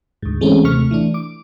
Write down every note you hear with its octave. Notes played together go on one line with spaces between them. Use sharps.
D2 G#2
E3 G#3 A3 C4 C#4
D#2 C3 A3 C#6 F6
E3 A3 D4
D6